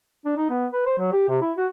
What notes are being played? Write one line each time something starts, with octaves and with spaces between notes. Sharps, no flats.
D4
D#4
B3
B4
C5
F#3
G4
C3
E4
F#4